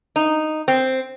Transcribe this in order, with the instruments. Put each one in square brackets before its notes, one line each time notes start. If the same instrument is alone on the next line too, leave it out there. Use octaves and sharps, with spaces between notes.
[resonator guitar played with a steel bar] D#4
C4